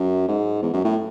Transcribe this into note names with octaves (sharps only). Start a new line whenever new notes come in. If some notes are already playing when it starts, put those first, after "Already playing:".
Already playing: F#2
G#2
E2
F#2
A2